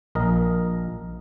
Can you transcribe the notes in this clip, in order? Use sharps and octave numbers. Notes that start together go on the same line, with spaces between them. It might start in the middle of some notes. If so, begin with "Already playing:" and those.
A#1 A#4 D#5